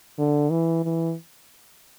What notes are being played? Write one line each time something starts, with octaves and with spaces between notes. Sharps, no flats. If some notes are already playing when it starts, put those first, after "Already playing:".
D3
E3
E3